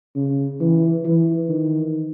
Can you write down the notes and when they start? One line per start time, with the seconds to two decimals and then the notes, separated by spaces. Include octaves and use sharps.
0.15 C#3
0.61 E3
1.05 E3
1.49 D#3